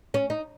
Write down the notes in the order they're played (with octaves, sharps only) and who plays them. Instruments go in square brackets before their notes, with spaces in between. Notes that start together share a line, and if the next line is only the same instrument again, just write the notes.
[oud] C#4
D#4